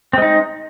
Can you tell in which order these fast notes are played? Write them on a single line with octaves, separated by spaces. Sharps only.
C4 G#3 D#4